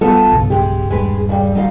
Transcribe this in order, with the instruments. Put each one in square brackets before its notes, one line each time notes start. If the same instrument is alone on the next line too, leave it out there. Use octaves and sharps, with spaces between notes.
[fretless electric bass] G3 [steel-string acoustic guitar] B3 F4 A4
[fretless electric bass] B1 G2 C#3
[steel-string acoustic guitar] G#3 G4
[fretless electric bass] D#1 G2 [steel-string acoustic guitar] G#3 B4
[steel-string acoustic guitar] C#3 G3
[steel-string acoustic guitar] D2 D#4 F5 [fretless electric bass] G3